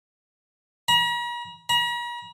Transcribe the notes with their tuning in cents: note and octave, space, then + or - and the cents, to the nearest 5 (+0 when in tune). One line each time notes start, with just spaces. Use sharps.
A#5 +45
A#5 +45